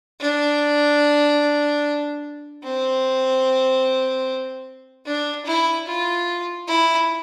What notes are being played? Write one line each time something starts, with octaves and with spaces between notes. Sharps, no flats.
D4
C4
D4
E4
F4
E4